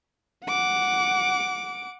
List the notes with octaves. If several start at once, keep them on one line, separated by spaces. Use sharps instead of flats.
F#5 D6